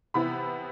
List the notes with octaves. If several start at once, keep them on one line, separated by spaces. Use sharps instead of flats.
C3 E3 B3 E4 B5